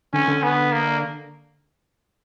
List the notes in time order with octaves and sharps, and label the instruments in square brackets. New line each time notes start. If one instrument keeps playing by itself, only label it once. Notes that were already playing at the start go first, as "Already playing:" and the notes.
[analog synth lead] D3 [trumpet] C#4
[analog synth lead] D3
[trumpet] B3
A#3